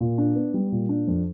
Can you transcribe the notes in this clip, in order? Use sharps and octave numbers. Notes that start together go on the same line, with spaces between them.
A#2
D4
B3
G3
A#2
D4
F2